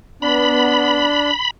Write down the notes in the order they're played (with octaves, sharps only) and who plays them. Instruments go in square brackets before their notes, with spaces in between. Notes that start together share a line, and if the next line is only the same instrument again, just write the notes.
[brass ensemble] B3 [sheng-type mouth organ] D4 [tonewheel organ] B5